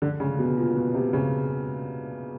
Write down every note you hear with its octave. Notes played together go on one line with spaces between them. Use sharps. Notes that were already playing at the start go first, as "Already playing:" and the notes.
D3
C#3
B2
A#2
B2
C3
C#3